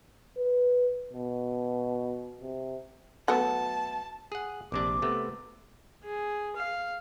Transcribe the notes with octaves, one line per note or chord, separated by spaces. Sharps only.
B4
B2
C3
F#3 A3 B3 A5
G#4 F#5
A#1 C3 D4 D6
C3 A3 B3
G#4
F5